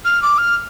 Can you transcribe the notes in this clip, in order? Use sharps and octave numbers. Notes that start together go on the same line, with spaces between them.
F6
D6
F6